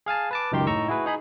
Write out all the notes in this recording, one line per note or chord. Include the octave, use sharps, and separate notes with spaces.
G#4 F5 G#5 A5
B4 A5 D6
C#2 F#2 D#3 G4 A#4 C6
A2 D#4 A#5 C#6 E6
E4 F#4 G#4 B4
D#4 G#4 B5